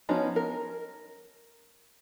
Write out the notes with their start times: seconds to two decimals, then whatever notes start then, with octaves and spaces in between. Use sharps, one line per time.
0.09 F3 B3 C#4 D#4 F#4
0.36 A#4